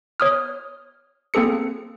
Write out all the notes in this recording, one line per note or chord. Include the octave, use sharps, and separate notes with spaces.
C#5 D#6 F6
A#3 C4 G#4 A4 C#7